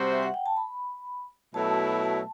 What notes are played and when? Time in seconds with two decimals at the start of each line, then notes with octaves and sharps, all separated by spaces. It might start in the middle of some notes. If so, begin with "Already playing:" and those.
Already playing: C3 G3 C4 F#4 C5
0.12 E5
0.23 F#5
0.34 G5
0.46 A5
0.57 B5
1.54 B2 F#3 A3 E4 A5
2.03 A5